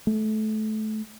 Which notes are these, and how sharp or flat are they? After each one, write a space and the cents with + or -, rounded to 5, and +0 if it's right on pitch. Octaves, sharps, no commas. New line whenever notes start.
A3 -25